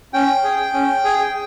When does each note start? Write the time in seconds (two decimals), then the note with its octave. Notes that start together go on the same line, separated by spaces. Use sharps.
0.14 C#4 G5
0.44 G#4
0.74 C#4
1.04 G#4